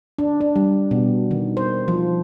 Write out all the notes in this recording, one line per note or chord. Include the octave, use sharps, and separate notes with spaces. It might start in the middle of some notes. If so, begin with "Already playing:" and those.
D4
D4
G3
B2
D#3
C5
F3